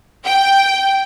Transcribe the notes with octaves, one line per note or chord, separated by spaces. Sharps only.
G5